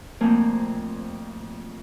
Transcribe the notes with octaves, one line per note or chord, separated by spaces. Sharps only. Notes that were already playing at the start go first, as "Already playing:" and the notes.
F2 A#2 A3 A#3 C4 G#5